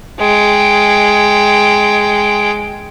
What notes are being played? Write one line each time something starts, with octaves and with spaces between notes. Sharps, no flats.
G#3 G5